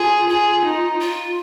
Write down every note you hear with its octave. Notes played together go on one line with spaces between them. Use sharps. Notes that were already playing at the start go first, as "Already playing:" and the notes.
Already playing: F4 G#4
F4 G#4
D#4
F4